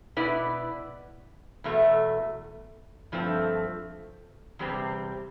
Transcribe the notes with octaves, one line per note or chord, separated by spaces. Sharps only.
B2 B3 E4 B4 D5
E2 B2 A3
G2 F3 A3 C4
E2 C3 G3 C4